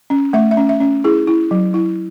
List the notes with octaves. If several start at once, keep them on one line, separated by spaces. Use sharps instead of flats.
C#4
A3 E5
E5
C#4
E5
C#4
E4 G#4
E4
F#3
E4